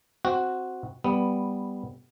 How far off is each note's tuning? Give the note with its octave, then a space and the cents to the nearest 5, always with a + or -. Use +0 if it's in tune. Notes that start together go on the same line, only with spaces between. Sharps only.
C4 +0 F#4 +0
G3 +5 B3 +0